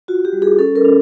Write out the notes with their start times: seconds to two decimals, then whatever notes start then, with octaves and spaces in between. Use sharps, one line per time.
0.08 F4 F#4
0.25 G4
0.33 G3
0.42 G#4
0.59 C#4 A4
0.76 A#4
0.85 C#4